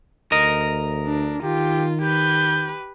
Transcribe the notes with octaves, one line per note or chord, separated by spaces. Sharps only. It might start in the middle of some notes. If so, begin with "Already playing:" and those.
D2 A#4 D#5
D4
D#3 F4 G4
G4 B4 G6